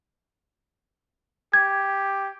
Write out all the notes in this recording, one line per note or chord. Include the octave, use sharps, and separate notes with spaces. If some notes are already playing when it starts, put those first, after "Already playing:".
G4 G#6